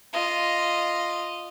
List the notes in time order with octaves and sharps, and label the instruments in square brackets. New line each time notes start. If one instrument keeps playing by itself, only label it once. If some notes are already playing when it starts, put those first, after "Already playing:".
[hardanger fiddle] F4 D#5